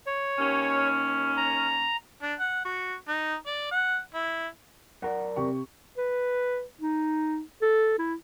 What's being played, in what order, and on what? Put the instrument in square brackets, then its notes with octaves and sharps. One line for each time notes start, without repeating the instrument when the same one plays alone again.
[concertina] C#5
[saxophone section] D#2 C#4
[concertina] A#5
[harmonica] D4
F#5
F#4
D#4
D5
F#5
E4
[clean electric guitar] F#2 A#4 D5 [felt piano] F#5
[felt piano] C3 G4 C#6
[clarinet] B4
D#4
A4
E4